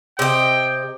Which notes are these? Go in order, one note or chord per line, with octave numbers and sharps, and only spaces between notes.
C3 D#5 G5